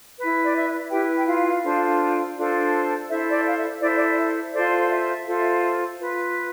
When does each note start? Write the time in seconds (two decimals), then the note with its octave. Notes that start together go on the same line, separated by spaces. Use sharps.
0.19 E4 B4
0.43 D5
0.55 E5
0.91 E4 G4 B4 G5
1.18 G5
1.27 F4 F5
1.63 D4 F4 A4 C5
2.36 D4 F4 A4 C5
3.08 E4 A4 C5 E5
3.32 D5
3.45 F5
3.57 E5
3.81 E4 A4 C5 D5
3.96 D5
4.18 E5
4.53 F4 A4 C5 D5
4.80 F5
4.90 E5
5.26 F4 A4 C5
5.98 F4 B4